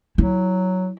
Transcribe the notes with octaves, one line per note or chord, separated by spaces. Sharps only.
F#3 E4